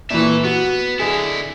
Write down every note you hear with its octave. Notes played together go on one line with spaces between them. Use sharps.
A#2 E3 A3 E5
B3 F#4
D3 E4 G#4